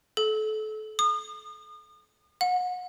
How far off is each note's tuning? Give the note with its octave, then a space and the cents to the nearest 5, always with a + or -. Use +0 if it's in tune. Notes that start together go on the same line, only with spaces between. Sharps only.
A4 -30
D#6 -35
F#5 -35